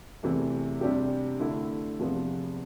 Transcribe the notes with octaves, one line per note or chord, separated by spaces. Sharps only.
E2 C3 E3 A3
C3 G3 D4 G4
D3 A3 E4
E2 C3 F3 B3